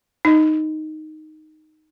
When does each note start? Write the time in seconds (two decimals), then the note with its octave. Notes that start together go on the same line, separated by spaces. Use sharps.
0.25 D#4 D#5